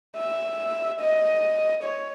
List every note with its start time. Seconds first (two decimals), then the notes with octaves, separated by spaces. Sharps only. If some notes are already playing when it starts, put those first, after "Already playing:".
0.17 E5
1.00 D#5
1.83 C#5